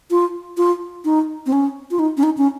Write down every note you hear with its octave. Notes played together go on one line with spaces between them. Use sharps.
F4
F4
D#4
C4
C#4
F4
D#4
C#4
D#4
C#4